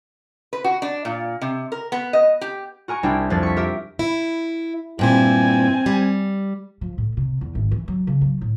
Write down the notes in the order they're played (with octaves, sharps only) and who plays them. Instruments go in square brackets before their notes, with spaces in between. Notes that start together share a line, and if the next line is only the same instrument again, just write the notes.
[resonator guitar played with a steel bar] B4
F#4
D4
A#2
C3
A#4
B3
D#5
G4
[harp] F#4 A#4 G#5 C#6
C2 D4 E4 G5
F2 F3 D4 A6
C#6 B6
G4 A#4 E5
[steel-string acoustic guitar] E4
[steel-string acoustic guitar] G2 A#2 E4 [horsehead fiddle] C4 G#5
[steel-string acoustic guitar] G3
[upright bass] F3
A2
C3
E2
G#1
E3
F#3
C#3
F#3
A2